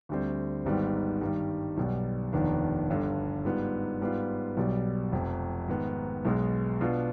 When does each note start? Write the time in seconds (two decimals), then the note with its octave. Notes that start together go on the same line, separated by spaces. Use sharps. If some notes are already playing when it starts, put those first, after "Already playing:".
0.09 D2 D3 G3 C4
0.65 G#1 G#2 D#3 G3 B3
1.21 G2 D#3 G3
1.77 B1 B2 G3
2.33 F1 D#2 D#3 B3 D4
2.89 G1 G2 D3
3.45 G#2 G3 B3 F4
4.01 G#2 G3 B3 F4
4.57 B1 B2 G3
5.12 F1 F2 C3
5.68 G#2 D#3 B3
6.25 B1 B2 G#3
6.81 B2 B3 D4 F4